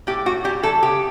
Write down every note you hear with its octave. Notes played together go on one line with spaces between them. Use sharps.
A2 G4
A2 F#4
G3 G4
E3 A4
C#3 G4